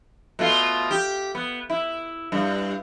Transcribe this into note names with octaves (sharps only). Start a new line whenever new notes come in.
B2 A3 F4
G4
B3
E4
G2